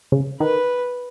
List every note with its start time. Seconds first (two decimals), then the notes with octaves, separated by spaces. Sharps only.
0.12 C#3
0.40 D#3 B4